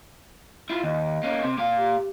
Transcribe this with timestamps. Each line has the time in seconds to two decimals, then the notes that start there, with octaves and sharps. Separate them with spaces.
0.70 E4 F4
0.83 D#2 D#5
1.23 A#3 C#4
1.42 C3
1.58 A#2 F5
1.78 G4